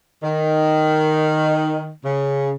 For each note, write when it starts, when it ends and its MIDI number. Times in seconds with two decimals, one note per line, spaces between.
0.23 1.90 51
2.05 2.53 49